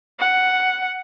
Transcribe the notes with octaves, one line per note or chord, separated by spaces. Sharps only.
F#5